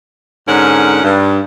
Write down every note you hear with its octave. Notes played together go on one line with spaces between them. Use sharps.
G#2 D3 C#4 A#4 F#5
G2